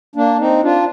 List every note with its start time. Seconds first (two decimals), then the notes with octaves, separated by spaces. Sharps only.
0.16 A#3 D4
0.40 C4 D#4
0.63 D4 F4